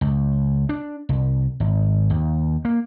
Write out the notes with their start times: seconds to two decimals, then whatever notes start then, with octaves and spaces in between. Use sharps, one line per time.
0.01 C#2
0.69 D4
1.09 C2
1.60 G#1
2.10 D#2
2.65 A#3